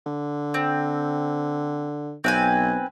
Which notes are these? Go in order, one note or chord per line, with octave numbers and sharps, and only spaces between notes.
D3
C4
B1 C4 B4 G#5